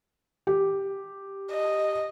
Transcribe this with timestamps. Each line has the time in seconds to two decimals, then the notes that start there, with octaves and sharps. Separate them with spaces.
0.47 G4
1.51 D#5